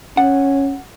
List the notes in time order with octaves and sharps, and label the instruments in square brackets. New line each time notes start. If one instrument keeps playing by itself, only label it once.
[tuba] C#4 [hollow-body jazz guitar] F#5